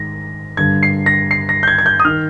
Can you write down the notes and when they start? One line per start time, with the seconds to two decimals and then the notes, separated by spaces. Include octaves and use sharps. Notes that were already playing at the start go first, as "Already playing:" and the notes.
Already playing: G#2 D#3 A#6
0.57 G2 D3 G#6
0.83 C7
1.06 A#6
1.31 C7
1.49 A#6
1.63 G6
1.68 G#6
1.78 G#6
1.86 G6
2.00 D#6
2.04 D#3 F6